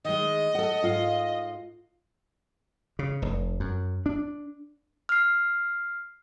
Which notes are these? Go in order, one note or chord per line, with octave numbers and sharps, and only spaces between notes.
D#3 G#3 D#5
A4 F#5
G#2 F4 F5
C#3
F1
F#2
D4
F6 C7